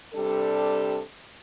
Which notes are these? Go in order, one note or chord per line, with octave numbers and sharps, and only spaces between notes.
C3 G3 D4 A4